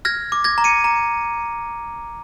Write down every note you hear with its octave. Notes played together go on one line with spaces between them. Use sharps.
F6 G#6 A#6
D6
G#6 A#6
A#5
C#7 D#7
A#5